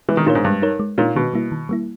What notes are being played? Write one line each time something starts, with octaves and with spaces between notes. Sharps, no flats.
E3 G#3
D#3
A#2 D#4 A#4 C#5
G#2
G2 G#3
D#4 A#4 C#5
G#3
A#2 D#4 A#4 C#5
B2 D#3
G3 A#3 E4
D#3
G3 A#3 E4